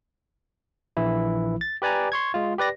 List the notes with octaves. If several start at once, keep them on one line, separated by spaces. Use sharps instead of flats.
A#1 E3 E4
A6
G4 B4 D5 G#5 A#5
C6 C#6 G#6
G#3 F4
G4 B4 D5 A#6